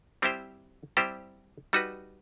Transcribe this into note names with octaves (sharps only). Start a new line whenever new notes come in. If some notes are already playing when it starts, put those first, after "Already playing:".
G3 C4 E4 G4 C5
G3 C4 E4 G4 C5
G3 D#4 F#4 B4